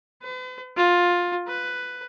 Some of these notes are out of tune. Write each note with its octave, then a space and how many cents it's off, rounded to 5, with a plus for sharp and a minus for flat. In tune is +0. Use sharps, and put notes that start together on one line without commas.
B4 +45
F4 +15
B4 +10